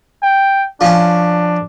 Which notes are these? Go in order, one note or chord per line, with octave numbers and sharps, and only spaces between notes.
G5
F3 C#4 D4